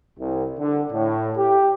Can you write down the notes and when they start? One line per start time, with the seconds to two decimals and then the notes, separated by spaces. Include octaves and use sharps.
0.18 C2
0.59 D3
0.92 A2
1.37 G4